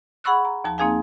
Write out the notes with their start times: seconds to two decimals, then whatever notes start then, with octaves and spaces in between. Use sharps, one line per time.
0.24 G#4 F#5 B5 C#6 E6 F#6
0.45 A#5
0.64 D#2 F3 A5
0.78 A#3 C4 D#4 G#4 F5 G#5